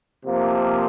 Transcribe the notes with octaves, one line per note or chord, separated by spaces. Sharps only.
C3 F3 A#3